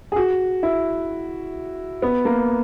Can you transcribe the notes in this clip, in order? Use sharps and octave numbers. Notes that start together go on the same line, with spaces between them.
G#4
F#4
E4
B3
A#3